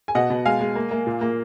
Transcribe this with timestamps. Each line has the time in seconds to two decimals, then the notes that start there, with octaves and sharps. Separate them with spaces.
0.08 G#5
0.15 B2 D#5 F#5
0.30 B2
0.46 G#3 F5 G#5
0.60 G#3
0.75 A#3
0.91 A#3
1.07 A#2
1.21 A#3